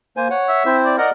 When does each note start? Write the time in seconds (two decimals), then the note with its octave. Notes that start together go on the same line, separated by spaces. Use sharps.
0.17 A#3 C5 G#5
0.30 C#5 F#5
0.49 E5
0.66 C4 E4 C5
0.85 D5
0.98 A#4 D5 D#5 F#5